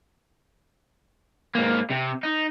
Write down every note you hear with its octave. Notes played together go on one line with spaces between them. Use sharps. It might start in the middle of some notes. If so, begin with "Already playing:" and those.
G#2 A#3
C3
D#4